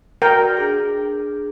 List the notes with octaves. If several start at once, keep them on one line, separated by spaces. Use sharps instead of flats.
F#4 A#4 D5 G5
D4 G#4